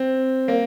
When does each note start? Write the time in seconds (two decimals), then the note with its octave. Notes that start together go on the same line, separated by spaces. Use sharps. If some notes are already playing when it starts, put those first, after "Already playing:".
Already playing: C4
0.48 A#3